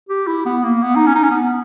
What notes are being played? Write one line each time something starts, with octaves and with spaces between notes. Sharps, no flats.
G4
E4
B3
A#3
B3
D#4
C#4
D#4
C#4
B3